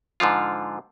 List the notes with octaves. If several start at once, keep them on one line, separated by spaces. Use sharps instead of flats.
G#2 D3 F3 F4